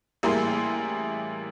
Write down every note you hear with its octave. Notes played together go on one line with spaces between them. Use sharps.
A1 G3 A#3 E4 G#4 C6